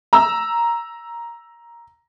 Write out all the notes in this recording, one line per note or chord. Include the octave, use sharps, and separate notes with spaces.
A#5 E6